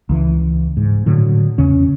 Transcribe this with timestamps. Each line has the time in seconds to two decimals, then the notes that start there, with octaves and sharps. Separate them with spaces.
0.09 C#2 E3
0.77 G#2
1.06 A2 D3 F#3
1.58 E2 C#3 C#4